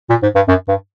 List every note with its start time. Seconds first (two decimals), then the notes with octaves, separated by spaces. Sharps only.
0.09 A#2
0.22 G#2
0.35 G2
0.48 F#2
0.68 G2